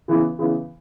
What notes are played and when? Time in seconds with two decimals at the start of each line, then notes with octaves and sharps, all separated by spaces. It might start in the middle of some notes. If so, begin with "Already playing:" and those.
0.08 C#3 E3 B3
0.39 C#3 E3 B3